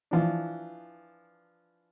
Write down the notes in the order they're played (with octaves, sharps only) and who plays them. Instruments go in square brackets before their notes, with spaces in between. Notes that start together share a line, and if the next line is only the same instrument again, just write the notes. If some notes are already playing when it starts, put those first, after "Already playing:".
[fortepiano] E3 F3 D4